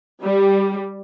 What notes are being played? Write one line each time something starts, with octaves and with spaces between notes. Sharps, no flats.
G3